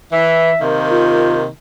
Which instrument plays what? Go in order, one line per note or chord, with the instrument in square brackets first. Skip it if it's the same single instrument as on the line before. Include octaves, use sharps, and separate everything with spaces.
[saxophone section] E3 [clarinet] E5
[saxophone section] C3 D#3 A#3
[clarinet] F4